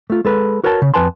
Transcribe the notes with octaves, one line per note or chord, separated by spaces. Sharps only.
A3 F4
G#3 A4 B4
F#4 A#4 B4 C#5 D#5 A5
C#3
F2 B4 G#5 A5 C6